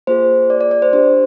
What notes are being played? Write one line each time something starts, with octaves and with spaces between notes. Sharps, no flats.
A#3 F4 G#4 C5
D5
D5
D5
C5
D4 G4 C5